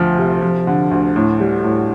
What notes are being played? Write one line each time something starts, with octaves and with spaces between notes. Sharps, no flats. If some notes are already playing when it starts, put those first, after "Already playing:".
Already playing: D2 F3
C3
F3
D3
D2
A2
G3
A2